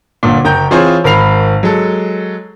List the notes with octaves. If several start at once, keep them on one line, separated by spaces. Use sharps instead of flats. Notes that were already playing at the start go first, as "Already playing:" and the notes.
G1 A#2
F#1 G5 A#5 G6
E3 C4 F4 G#4 C5 C#5
G#1 A#4 B5 C7 F7
F#3 G#3 A4